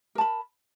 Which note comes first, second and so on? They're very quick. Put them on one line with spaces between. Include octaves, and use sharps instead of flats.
A#4 A5 B5